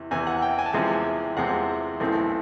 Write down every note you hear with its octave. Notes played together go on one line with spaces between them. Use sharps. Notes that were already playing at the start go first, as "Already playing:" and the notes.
Already playing: E2 C3
E2 C3 E3 G#5
F#5
G5
G#5
A5
E2 C3 F3 G#3 C4 G#5
E2 C3 F3 G#3 C4 F#5
B1 A2 E3 A3 C4